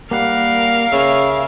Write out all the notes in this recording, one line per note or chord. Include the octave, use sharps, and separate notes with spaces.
G3 A#3 A#4 F5 F#5
C#3 E5